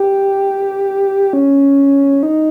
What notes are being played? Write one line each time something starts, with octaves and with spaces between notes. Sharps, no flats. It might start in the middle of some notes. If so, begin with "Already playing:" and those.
Already playing: G4
C#4
D#4